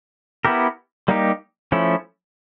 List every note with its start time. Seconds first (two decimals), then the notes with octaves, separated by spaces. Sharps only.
0.45 B3 E4 G4 A#4
1.08 G3 A#3 D#4 G4
1.72 F3 A3 C#4 E4